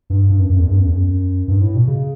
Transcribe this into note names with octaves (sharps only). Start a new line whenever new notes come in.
G2
G2
F#2
F#2
E2
G2
F#2
E2
F#2
G2
A2
B2
C#3